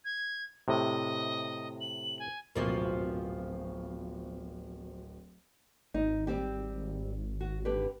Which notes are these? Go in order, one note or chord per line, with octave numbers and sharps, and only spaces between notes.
G#6
A2 C3 D#5
F#7
G#5
D1 G#1 B2 F3 A#3
G#1 D#4
G3 C4 G4
F#4
D3 G4 B4